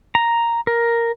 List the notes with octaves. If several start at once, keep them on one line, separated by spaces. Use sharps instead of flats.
A#5
A#4